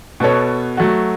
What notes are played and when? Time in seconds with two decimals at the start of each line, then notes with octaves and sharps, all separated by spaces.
0.20 B2 B3 A4 C#5
0.77 F#3 A3 F#4